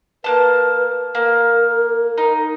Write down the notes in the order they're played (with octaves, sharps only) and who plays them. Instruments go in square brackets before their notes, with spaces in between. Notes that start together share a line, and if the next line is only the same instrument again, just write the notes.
[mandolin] A#3 B3 A5 [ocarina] B4
[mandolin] A#3 [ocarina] A#4
[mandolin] D#4